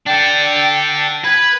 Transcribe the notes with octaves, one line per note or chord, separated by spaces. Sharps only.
D4 A4 G5
B4 G#6